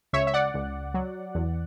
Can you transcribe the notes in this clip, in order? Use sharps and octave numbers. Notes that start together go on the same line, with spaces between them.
C#2 C#5 E5
E5
D5 F#5
C#2
F#3
E2